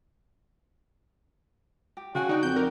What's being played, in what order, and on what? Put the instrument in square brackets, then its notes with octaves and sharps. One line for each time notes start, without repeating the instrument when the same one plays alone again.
[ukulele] G4
[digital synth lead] C#3 [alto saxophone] F#4 [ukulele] F5 G5 G#5
[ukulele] D4 D#5 G5 [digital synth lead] D#4
[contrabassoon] F2 [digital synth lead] G6
[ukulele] D#4 G4 [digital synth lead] A#4